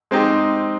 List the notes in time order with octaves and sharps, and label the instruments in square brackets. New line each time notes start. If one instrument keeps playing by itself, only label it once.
[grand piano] G#3 C4 D#4 G4